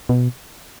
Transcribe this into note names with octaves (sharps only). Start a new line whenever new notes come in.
B2